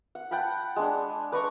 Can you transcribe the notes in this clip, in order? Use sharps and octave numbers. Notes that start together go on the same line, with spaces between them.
F#5
F#5 G5 A5 B5
G#3 D4
B4 D5 A#5 C#6